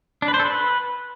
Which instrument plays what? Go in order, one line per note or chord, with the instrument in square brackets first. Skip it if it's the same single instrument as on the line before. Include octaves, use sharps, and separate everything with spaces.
[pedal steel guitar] D4
B4
C5
A4
B4